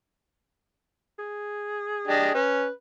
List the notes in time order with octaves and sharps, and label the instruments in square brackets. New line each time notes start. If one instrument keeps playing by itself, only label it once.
[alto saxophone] G#4
[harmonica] D4 G4 D#5
[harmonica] C#4 [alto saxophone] B4